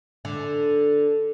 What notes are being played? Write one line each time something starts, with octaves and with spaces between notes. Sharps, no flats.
D3